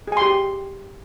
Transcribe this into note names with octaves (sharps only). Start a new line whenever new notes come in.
G4 G#4 G#5 C6